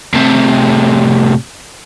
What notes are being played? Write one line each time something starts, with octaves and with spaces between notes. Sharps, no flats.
A2 C3